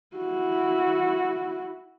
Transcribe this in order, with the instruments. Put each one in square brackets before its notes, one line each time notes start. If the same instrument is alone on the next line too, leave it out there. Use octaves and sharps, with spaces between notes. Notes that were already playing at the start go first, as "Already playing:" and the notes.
[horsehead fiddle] E4 F#4